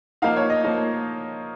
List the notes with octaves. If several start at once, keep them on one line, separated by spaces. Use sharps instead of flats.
F3 A#3 D#4 F5
C#5
D#5
F3 A#3 D#4